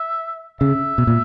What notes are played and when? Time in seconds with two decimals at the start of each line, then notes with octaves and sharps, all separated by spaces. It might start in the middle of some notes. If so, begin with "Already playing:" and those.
Already playing: E5
0.60 C#3 E5
0.98 B2
1.07 A#2